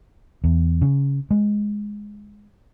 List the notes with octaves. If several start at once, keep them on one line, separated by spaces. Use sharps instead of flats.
E2
C#3
G#3